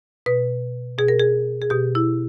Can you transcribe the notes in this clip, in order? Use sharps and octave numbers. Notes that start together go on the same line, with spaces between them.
B2 B4
B2 G#4
A#4
G#4
G#4
B2 G4
E4